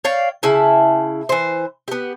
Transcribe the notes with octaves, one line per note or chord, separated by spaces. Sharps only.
C#5 D5 F5 G5
C#3 E4 A5
E3 C5
B3 G4